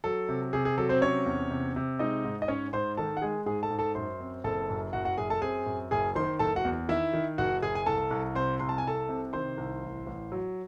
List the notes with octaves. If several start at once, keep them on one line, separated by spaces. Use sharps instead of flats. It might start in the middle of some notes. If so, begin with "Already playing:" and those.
F#3 A4
C3
C3 G#4
G#4
F#3 A4
C4 C5
C3 C#4 C#5
E2
C3
C3
G#3 D#4 D#5
G#2
D#5
G#2 C#4 C#5
G#2 C5 C6
D#3 A4 A5
F#5
G#3 G#4 G#5
G#2 G#4 G#5
A4 A5
G#2
A4 A5
F#2 C5 C6
C4
F#1 A4 A5
F#2
F#1 F#4 F#5
F#4 F#5
F#2 G#4 G#5
A4 A5
C4 G#4 G#5
F#2
F#1 G#4 G#5
D#3 C5 C6
F#1 A4 A5
F#4 F#5
E2
D#3 E4 E5
D#3
F#1 F#4 F#5
F#1 G#4 G#5
G#5
C2 A4 A5
C2
C3 C5 C6
C2 C6
A5
G#5
C2 A4 A5
C3
D#3 C5 C6
C2
A1
A1
F#3